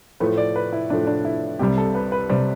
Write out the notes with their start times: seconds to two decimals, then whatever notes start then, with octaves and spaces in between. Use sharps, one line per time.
0.20 A2 F3 A3 B4
0.37 D5
0.56 B4
0.73 E4
0.90 A2 F3 A3 D4
1.07 D4
1.25 E4
1.59 C2 C3 G3 G4
1.78 A4
1.95 B4
2.12 B4
2.30 C3 G3 C5